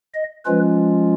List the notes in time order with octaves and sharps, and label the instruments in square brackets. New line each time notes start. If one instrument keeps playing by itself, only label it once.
[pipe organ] D#5
F3 G#3 C#4 F4 B4